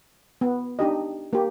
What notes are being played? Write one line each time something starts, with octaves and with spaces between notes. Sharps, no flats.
B3
D4 D#4 G4 D#5
A#3 G4